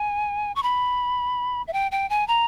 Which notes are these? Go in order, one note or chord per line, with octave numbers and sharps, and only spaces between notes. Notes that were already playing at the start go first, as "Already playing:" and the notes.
Already playing: G#5
C#6
B5
E5
G5
G5
G#5
A#5